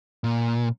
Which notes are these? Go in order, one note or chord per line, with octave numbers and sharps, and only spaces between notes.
A#2